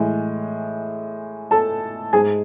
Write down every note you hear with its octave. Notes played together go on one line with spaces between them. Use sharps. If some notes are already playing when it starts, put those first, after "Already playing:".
Already playing: A2 E3 G#3
A4 A5
G#2 G#3 G#4 G#5